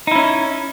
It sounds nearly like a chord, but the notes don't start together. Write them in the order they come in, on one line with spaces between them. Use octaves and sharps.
D#4 E4 C#4